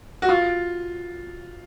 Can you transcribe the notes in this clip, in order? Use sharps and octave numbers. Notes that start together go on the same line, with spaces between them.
F#4
F4